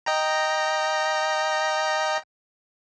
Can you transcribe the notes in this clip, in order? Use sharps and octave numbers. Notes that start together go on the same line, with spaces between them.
D#5 G5 A#5